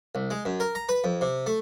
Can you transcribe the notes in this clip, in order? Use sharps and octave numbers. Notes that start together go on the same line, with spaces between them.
C2
G#3
F#2
A#4
A#5
B4
F2
C3
A3